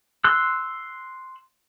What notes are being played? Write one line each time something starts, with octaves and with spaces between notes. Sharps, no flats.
C6 E6 F#6